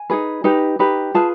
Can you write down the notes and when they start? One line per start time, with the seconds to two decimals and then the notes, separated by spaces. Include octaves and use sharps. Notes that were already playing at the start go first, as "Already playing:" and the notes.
Already playing: G#5
0.10 D#4 G#4 B4
0.44 D#4 G4 B4
0.79 D#4 G4 B4
1.14 F4 G#4 B4 A5